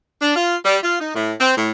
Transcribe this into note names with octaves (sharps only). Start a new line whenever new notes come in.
D4
F4
G3
F4
D#4
A2
C4
A2